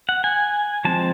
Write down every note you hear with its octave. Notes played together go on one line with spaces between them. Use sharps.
F#5
G#5
F3 G#3 C4 A5